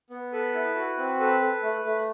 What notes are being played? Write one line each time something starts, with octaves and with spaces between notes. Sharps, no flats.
B3
A4 B4
E4
F#4
C4
A4 B4
A4
A3
A3